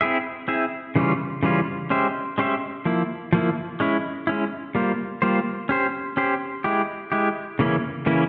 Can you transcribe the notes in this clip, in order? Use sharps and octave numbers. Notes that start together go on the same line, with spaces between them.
C4 E4 G#4 E5
C4 E4 G#4 E5
C#3 E3 G3 C#4 F4
C#3 E3 G3 C#4 F4
G#3 C#4 G4 C5 E5
G#3 C#4 G4 C5 E5
F3 A#3 E4
F3 A#3 E4
G#3 C#4 E4
G#3 C#4 E4
G3 A#3 F4 C5
G3 A#3 F4 C5
C#4 G4 C5
C#4 G4 C5
G#3 E4 G4
G#3 E4 G4
C#3 E3 A#3 C#4 E4
C#3 E3 A#3 C#4 E4